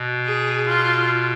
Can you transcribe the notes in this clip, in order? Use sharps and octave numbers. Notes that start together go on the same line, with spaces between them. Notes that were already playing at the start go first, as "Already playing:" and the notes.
Already playing: B2
G#4
F4